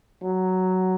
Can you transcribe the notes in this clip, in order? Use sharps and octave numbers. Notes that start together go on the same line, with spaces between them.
F#3